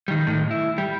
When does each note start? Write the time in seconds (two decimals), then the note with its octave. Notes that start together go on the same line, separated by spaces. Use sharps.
0.08 D#3 G3
0.27 A2 D#3
0.51 E4
0.78 G3